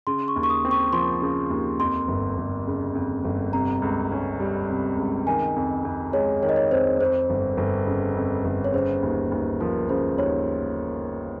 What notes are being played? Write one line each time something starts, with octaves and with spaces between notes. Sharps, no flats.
C#3 C6
C#6
D#2
C#6
D#6
C4
C#6
F3 C6
C#3
D#2
F2 C6
G1
G1
C#3
F2
G1
C3 A#5
C#2
C#4
G3
C3
C#2
D#3 G#5
F2
F2
G#3 C#5
D#3 C#5
D#5
C#5
F2 C5
F2 C5
G1
G1
C#3
F2
G1
C#5
C#3 C5
D#2
D#2
F3 A#4
C#3 C5
D#2 C#5